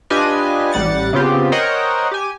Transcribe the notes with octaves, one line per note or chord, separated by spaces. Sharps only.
D4 F4 G4 B4 D#5 G#5
A1 G3 F#5 A6 C#7
C#3 B3 C4 F4 G4
A#4 C5 C#5 D#5 F#5 G5
G4 G#5